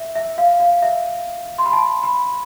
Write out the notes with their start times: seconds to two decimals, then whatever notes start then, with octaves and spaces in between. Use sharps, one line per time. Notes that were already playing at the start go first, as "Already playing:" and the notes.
Already playing: E5
0.15 E5
0.38 F5
0.60 F5
0.82 E5
1.58 C6
1.66 B5
1.73 A5
2.03 B5